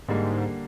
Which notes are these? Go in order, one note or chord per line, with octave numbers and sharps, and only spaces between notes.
G#2 D3 G3 A#3